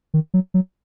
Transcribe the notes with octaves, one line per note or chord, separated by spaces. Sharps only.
D#3
F#3
F#3